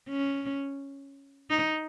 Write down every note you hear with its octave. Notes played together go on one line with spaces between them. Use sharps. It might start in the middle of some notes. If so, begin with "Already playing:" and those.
C#4
D#4